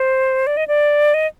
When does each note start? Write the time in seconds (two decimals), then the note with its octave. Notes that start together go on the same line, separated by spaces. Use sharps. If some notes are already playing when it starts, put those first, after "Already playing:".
Already playing: C5
0.47 D5
0.57 D#5
0.68 D5
1.14 D#5